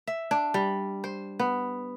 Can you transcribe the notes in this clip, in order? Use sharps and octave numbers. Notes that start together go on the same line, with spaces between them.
E5
D4
G3
C5
B3